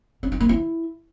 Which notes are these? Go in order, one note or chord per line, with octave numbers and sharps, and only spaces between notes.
C#4
D#4
A#3
E4